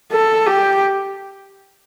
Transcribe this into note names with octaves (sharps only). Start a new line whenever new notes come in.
A4
G4